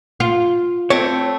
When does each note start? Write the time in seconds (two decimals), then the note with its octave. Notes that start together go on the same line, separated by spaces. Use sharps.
0.20 F4
0.90 A3 C4 C#5